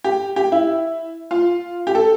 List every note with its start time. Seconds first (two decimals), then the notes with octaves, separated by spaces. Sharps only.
0.04 G4
0.36 G4
0.52 E4
1.31 F4
1.87 G4
1.95 A4